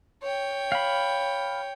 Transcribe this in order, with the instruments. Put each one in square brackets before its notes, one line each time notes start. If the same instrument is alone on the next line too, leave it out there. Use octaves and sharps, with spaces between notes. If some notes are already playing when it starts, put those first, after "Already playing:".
[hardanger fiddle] C#5 G5
[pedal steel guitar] F5 B5